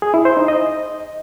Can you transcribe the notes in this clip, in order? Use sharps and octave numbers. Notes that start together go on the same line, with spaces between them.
G#4
E4
C5
D#4
D#5